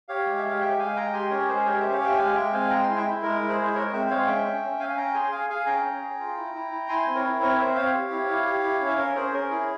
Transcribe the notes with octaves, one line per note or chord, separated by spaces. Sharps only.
G4 C#5 F5
G#3
E5
G4
F5
G#3 E5 G5
G#3 F5 G#5
G#3 G5 A#5
G4 G#5 C6
C#4 A#4 C#5
G#3 G#4 C5
G4 A#4 C#5
C#4 C5 E5
C#5 F5
G4 E5 G5
G#3 F5 G#5
G#3 E5 G5
C4 F5 G#5
G#3 G5 A#5
E4 G#5 C6
E5 G5
E4
G#3 A#4
E4
G#4 C5
G#3
E5
G#3 A#4 C#5
C#5
C4 C5 E5
G#3 C#5 F5
C#4 E5 G5
C#4
C#4
C#4 F5 G#5
G#5
C#4 G5 A#5
G#4 G#5 C6
G#4 F5 G#5
G#4 F5 G#5
C#4 G5 A#5
C#4
G#4
F4
E4
E4
E4
E4 G#5 C6
C4
A#4 C#5
E4
C4 A#4 C#5
C4 C5 E5
C4 C#5 F5
G4
E4
E4
G4
E4
C#4
E5
C#4 A#4 C#5
C#4 G#4 C5
C#4 A#4
E4 G#4